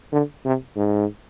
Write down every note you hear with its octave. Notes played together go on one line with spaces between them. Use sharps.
D3
C3
G#2